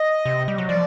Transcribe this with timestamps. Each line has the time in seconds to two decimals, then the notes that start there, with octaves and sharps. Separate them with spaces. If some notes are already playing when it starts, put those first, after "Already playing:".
Already playing: D#5
0.26 C3
0.48 G3
0.58 F#3
0.68 F3 D5